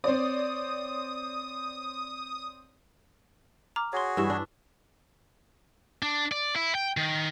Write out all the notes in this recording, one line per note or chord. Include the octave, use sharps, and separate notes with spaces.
C4 C#5 D5 D#6
A#5 D6 F6
F#4 G#4 C#5 C6
G2 E3 E5
D4
D4
D5
E4
G5
D#3